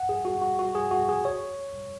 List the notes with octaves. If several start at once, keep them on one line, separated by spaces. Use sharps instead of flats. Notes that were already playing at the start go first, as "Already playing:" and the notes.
Already playing: F#5
G#4
F#4
F#4
F#4
G#4
F#4
G#4
C#5